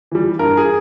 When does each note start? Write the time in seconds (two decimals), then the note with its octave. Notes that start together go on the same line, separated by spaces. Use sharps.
0.12 E3 G3
0.39 G2 A#4
0.57 G#4